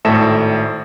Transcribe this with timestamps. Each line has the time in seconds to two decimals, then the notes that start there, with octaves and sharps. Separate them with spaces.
0.05 G#1 A2 A4 E5 A#6 E7